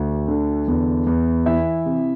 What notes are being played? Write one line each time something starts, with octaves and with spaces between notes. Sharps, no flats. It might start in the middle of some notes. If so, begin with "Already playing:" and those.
Already playing: D2 F#4
D3
E2
E2
E3 E4 E5
C3